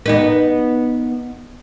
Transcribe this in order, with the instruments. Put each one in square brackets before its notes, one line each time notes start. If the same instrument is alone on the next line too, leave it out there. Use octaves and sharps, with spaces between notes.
[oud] B3 D#4 B4